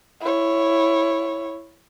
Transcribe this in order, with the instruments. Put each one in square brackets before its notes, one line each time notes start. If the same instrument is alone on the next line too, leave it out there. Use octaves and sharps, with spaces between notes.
[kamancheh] E4 C#5